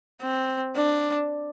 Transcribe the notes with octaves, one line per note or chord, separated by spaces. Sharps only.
C4
D4